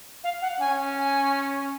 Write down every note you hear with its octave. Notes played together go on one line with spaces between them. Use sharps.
F5
F#5
C#4 G#5
G#5